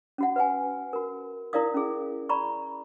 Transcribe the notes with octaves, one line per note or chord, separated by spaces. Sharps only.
C#4 F#4 F#5
B4 F#5 G#5
F#4 A#4
E4 A#4 D5 F5 D#6
C#4 G#4
D5 A#5 B5 C#6